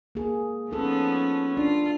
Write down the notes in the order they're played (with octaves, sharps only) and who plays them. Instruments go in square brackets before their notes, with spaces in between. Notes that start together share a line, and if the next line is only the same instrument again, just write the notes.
[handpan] A#3 G#4
[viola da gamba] F3 B3 C#4 [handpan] D#4 A4
[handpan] D4 [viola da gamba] F4